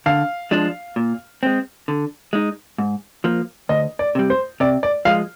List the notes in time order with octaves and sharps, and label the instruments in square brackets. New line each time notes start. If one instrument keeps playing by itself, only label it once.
[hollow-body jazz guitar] D3 [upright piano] F5
[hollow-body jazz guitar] F3 G#3 D4
A#2
G#3 C4
D3
G#3 D#4
G#2
F3 A#3
[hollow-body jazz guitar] D2 [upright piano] D#5
[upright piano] D5
[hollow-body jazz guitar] C3 G3
[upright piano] C5
[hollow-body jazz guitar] C3 [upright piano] D5
[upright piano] D5
[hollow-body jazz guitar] F3 G#3 [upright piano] F5